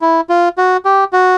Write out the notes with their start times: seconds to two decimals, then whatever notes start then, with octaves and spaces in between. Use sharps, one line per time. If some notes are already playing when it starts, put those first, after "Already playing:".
0.01 E4
0.29 F4
0.58 F#4
0.85 G4
1.13 F#4